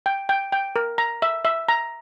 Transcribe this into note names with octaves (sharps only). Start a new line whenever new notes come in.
G5
G5
G5
A#4
A#5
E5
E5
A#5